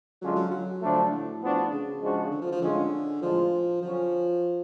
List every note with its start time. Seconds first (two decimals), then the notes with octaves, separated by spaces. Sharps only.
0.21 D3 F#3 G#3 C#4 F4
0.36 F#3
0.51 F#3
0.81 D3 F3 A3 D4
1.12 A2
1.42 F3 B3 D4 F#4
1.71 C#3
2.02 F3 G#3 D4 F#4
2.31 D3
2.41 F3
2.52 F3
2.62 A2 D3 G#3 C#4 F4
3.21 A2 F3 G#3 D4 F4
3.82 D3 F3 F#3 C#4